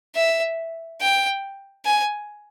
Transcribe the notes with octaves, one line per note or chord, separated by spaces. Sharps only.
E5
G5
G#5